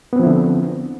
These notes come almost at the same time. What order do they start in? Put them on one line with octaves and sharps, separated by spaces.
B3 C4 F3 E4 D3